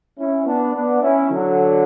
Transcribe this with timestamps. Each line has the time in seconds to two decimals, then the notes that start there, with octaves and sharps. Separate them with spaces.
0.18 C#4 E4
0.46 B3 D4
0.74 B3 D4
1.02 C#4 E4
1.30 D3 F#3